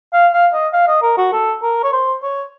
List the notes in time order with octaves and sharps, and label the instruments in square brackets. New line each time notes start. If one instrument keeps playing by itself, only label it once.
[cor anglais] F5
F5
D#5
F5
D#5
A#4
F#4
A4
A#4
C#5
C5
C#5